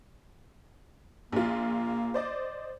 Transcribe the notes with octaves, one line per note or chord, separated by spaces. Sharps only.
A#1 A#3 F4
C5 D5 D#5